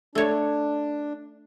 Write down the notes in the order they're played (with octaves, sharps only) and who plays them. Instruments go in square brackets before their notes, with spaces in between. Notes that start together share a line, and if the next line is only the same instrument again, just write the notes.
[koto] A3 C#5 [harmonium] D4